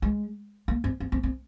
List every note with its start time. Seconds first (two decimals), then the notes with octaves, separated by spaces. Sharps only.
0.02 G#3
0.68 A#3
0.84 C4
1.00 C4
1.12 C4
1.23 C4